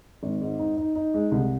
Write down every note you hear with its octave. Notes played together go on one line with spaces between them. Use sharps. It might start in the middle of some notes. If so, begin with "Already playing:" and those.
G#1
G#2
D#4
D#4
D#4
G#3
C2